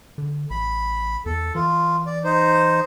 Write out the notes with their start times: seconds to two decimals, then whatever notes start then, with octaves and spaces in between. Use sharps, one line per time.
0.18 D3
0.50 A1 B5
1.26 E2 A4
1.55 E3 F4
2.06 D5
2.24 D#4 C5